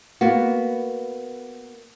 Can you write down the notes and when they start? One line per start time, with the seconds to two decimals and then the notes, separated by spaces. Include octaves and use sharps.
0.21 A#3 B3 F#4